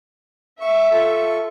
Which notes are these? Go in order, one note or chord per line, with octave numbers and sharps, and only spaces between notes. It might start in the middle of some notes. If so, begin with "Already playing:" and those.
E5 C#6
F4 A4 C#6